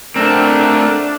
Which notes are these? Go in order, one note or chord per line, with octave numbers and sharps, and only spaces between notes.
A3 C4 D4 A#4